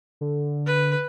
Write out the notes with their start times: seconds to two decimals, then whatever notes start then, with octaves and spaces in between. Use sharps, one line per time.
0.21 D3
0.66 B4